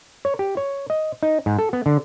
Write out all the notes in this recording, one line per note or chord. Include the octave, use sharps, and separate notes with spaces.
C#5
G4
C#5
D#5
D#4
G#2
A4
B3
D3